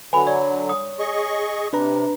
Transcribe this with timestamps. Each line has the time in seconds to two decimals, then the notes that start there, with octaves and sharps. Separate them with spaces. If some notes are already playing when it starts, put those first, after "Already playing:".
0.13 D3 F#3 B4 G#5 B5
0.27 C#5 D5
0.69 D#6
0.99 G#4 D#5 C#6
1.73 C3 D4 B4 A#5